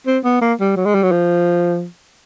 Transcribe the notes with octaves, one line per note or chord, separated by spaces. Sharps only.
C4
B3
A#3
G3
F#3
G#3
G3
F#3
F3